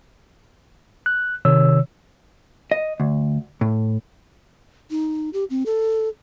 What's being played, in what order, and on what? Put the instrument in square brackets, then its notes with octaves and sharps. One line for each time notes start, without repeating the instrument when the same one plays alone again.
[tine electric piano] F#6
C3 D#3 C#5 E6
[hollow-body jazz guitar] D#5
D2
A2
[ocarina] D#4
G4
C4
A4